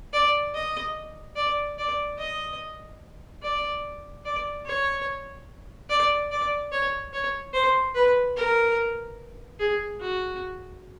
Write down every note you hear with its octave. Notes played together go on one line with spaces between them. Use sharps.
D5
D#5
D5
D5
D#5
D5
D5
C#5
D5
D5
C#5
C#5
C5
B4
A#4
G#4
F#4